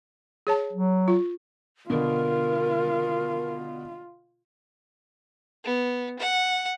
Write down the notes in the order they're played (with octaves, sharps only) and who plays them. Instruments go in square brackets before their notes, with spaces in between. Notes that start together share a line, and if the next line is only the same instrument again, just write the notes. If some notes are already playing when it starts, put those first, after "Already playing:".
[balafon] G#4 C#5 A5
[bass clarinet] F#3
[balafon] F4
[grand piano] B2 D3 [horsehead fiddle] F4 [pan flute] A#4
[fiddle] B3
F#5